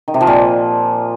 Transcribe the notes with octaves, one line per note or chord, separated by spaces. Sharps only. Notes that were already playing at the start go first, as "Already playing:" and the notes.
D#3
C3
F3
A#2